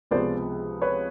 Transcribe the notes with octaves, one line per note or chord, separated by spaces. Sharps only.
C#2 C3 F3 G#3 B3 C5 D5
B4 C#5